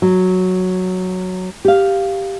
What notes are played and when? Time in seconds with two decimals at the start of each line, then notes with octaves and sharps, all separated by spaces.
0.02 F#3
1.65 G4 F5